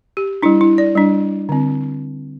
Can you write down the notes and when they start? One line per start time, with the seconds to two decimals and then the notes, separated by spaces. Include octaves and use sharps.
0.17 G4
0.43 G3 D4 E4
0.61 E4
0.78 D5
0.95 G3 D4
1.49 D3 C4